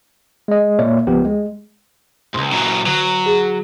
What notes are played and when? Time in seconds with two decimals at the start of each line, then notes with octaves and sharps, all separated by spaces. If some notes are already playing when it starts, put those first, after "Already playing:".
0.48 G#3 D#5
0.79 A#2 A#3 C#5 D5 E5
1.07 C#2 F3 B3 G4 G5
1.25 G#3
2.34 C#2 G#2 C6
2.52 A#2 F#3
2.86 D3 F#3
3.26 G#4